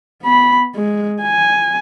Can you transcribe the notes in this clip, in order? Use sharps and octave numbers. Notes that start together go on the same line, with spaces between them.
B3 B5
G#3
G#5